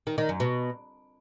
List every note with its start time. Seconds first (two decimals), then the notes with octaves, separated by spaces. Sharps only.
0.07 D#3
0.18 D#3
0.29 F#2
0.40 B2